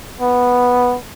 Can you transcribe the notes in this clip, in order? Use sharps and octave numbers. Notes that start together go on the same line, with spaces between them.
B3